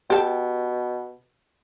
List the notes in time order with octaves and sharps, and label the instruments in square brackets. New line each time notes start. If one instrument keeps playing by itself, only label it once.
[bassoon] B2 [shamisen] G4 A4